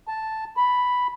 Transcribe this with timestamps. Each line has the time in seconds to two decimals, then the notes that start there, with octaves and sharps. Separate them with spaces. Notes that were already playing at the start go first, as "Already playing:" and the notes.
0.08 A5
0.57 B5